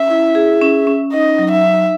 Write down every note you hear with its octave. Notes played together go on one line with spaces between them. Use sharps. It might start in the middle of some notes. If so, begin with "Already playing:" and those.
Already playing: C#4 E5
E4
G#4
C#4
C#4
D#4 D#5
F#3
E5
D#4